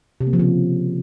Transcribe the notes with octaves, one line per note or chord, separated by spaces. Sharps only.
C3
A#3
F3
C#3